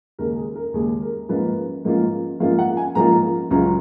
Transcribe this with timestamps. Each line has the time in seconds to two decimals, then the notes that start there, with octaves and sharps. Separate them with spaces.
0.19 D#2 C#3 G#3 A#4
0.37 G#4
0.56 A#4
0.74 D#2 C#3 G#3 G#4
1.02 A#4
1.29 G#2 F3 A#3 C#4 F4 B4
1.85 G#2 F3 A#3 C#4 F4
2.40 G#2 F3 A#3 C#4 F4 F5
2.59 F#5
2.77 G#5
2.95 G#2 F3 A#3 C#4 F4 A#5
3.50 C#2 C#3 F#3 C#4 F4 A#5